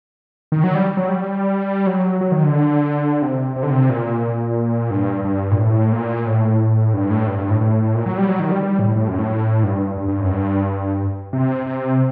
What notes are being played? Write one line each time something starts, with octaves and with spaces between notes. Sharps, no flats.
D#3
F#3
G3
F#3
G3
F#3
F#3
D#3
D3
C3
C3
D3
C3
A#2
G2
G2
A#2
A2
A#2
A2
G2
A2
G2
G2
A2
A2
A#2
F#3
G3
F#3
D#3
G3
G3
A2
A2
F#2
A2
G2
G2
G2
F#2
G2
C3
C3